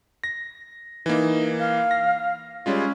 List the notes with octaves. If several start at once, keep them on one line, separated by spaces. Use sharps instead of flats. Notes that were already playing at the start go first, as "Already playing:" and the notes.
A#6
E3 A#3 D#4
F5
A#6
G3 G#3 C#4 F4